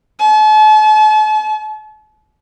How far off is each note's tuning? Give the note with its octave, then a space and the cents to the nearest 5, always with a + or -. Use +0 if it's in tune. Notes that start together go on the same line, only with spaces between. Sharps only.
A5 -40